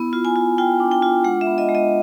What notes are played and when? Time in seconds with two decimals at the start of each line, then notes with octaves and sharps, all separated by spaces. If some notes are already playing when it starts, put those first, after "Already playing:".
Already playing: B3 E4
0.13 F4
0.25 G#5
0.36 F4
0.58 F4 G5
0.80 D4
0.91 G5
1.02 F4
1.24 G#3 F#5
1.41 E5
1.47 B3
1.58 D#5
1.69 G#3
1.75 D#5